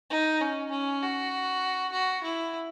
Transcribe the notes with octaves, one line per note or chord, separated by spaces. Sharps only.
D#4
C#4
C#4
F#4
F#4
E4